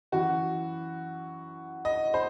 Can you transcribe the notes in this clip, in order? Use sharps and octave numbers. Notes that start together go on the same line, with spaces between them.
F#2 E3 F#4
D#5
C5